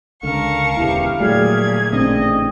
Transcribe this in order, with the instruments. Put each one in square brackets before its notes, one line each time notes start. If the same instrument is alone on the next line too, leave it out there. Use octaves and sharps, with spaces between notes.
[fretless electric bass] C#2 [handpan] D3 [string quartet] A#4 A5 C#6 [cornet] F5
[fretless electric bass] E1 E2 C#3 [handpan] E4 G4
[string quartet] A#2 G#6 [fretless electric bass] F#3 G3 [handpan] A3 G#4
[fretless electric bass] A1 [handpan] C#3 C4 D4 [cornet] D#5